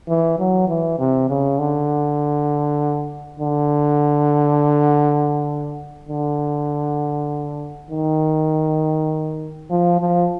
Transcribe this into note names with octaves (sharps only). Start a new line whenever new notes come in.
E3
F#3
E3
C3
C#3
D3
D3
D3
D#3
F3
F3